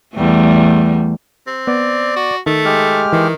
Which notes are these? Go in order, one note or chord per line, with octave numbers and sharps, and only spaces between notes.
E2 G3 A3
C4
B3 D5
F#4
D#3 A3
G#3 G4 F6
D#3 E3